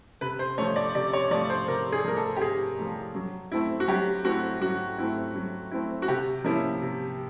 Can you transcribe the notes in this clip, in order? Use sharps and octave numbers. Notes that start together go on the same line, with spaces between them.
C3 B4
C5
F3 A3 C#5
D5
C3 D5
C#5
F3 A3 D5
C5
C3 A#4
G#4
F3 A3 A#4
A4
G4
C3 G#4
F3 A3
F#3
A3 C4 E4
F#4
F#3 G4
A3 C4 E4 F#4
F#3 F#4
A3 C4 E4
F#3
A3 C4 E4
F#4
C3 G4
F3 A#3 C#4 E4
C3